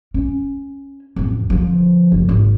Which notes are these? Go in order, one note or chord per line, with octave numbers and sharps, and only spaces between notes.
C#4
A1 F2
D3 F3
F#1
G#1